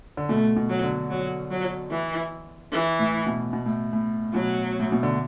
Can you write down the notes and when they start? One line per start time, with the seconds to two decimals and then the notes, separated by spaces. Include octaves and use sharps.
0.17 D3
0.29 B2 A3
0.57 B2
0.70 F#3
0.84 D3
1.10 F#3
1.51 F#3
1.91 E3
2.72 E3
2.99 A2
3.26 B2
3.53 B2
3.66 A2
3.93 A2
4.34 B2 F#3
4.80 A2
4.92 B2
5.03 D3